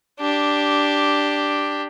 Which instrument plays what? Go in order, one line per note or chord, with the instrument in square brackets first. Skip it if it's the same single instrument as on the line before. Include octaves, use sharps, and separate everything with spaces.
[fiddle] D4 G4